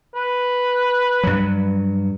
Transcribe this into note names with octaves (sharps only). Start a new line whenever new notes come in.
B4
G2 F#3